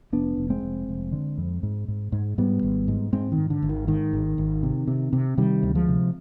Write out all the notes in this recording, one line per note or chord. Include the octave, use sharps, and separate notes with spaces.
F1 B3 D4
F1
G#3 C4
F1
F1
D3
F2
G#2
G#2
G#2
G#2 G3 B3
G#1
G#2
G#2 G#3 C4
D#3
G#2
D3
G#1
D#3
G#2 D#3
G#1
G#1
C3
C3
C3
C3 D#3 G3
D2
F3 G#3
C3